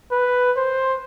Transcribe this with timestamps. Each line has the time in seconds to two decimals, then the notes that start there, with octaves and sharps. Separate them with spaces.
0.11 B4
0.57 C5